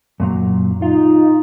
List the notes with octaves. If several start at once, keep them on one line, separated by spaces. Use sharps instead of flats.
F#2 A#2 F#3
D#4 F4